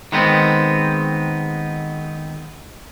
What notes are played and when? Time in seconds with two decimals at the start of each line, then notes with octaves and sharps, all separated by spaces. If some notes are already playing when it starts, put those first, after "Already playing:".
0.12 D#3 G#3 B3 C4